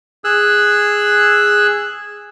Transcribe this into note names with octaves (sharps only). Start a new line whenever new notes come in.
G#4 E6 F#6